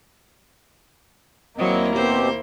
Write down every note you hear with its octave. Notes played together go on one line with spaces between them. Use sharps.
D#2 F#3 A#3 C4 E4 D#5
B2 C4 G4 C5